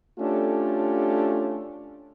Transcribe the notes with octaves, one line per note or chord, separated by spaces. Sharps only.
A3 C#4 D4 F4 G4 A4